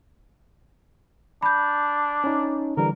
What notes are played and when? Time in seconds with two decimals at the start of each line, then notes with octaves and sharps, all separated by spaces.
1.42 D4 B5 G6
2.24 C#4 D#4
2.77 D3 E3 G3 A#4